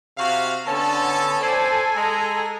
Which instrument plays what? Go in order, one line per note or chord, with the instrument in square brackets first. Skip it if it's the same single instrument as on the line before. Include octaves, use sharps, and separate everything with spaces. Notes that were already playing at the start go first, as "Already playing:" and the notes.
[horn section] C3 F#4 F5
[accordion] D3 A5 [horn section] B3 C#4 A4
[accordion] A4 G#5 [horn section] C5 D5
[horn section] G#3 A#5